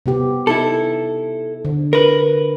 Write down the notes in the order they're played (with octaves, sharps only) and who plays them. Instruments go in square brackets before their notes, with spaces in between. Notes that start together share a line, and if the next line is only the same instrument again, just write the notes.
[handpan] C3 B3 G4
[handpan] D#4 [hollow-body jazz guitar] E4 A4
[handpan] D3
[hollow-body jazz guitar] A#4 B4